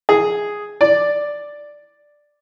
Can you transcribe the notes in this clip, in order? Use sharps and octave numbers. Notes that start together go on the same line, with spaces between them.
G#4
D5